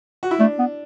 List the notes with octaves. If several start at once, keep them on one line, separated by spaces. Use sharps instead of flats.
F#4
E4
A3 D4
B3